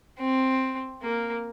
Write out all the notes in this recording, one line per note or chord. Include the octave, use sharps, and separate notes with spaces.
C4
A#3